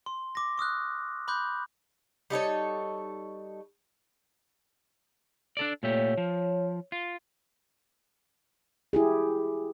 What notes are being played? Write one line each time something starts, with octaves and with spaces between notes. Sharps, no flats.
C6
D6 A#6
C#6 D#6 F6 F#6
B5 C6 D6 F#6 G6
G3 D#4 A4 C#5
D4 A4 D5
A#2 A3 G4 C#5
F3
F4
E4 G4 G#4